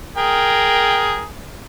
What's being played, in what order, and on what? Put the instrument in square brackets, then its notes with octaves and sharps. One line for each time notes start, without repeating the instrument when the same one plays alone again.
[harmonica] G#4 A#4 G5